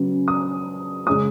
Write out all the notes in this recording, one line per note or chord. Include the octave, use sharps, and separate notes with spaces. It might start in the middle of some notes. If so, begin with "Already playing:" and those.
Already playing: C#3 F#3 B3
D#6
C#3 G#3 C#4 D#6